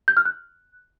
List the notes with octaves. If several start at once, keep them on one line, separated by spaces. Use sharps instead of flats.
G6
F6
F#6